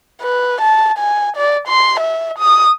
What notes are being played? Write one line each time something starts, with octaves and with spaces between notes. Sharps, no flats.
B4
A5
G#5
D5
C6
E5
D#6